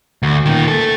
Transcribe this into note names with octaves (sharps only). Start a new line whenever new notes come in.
D2
A#2 D#3
A3 A4